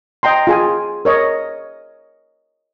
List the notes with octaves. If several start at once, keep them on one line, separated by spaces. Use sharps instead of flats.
D#5 G5 A#5 C6
F4 G#4 G#5
A#4 C#5 D#5